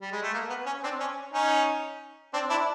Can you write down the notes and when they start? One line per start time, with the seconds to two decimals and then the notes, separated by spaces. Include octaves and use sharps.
0.02 G3
0.12 G#3
0.23 A3
0.34 A#3
0.50 B3
0.66 C#4
0.84 C4 D4
1.00 C#4
1.33 C#4 D#4
2.34 C4 D4
2.50 D4 E4